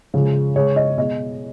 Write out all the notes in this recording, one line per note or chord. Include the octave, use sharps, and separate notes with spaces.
C#3 F3 G#3
C#3 G#3 C#5
D#5
B2 G#3 D#5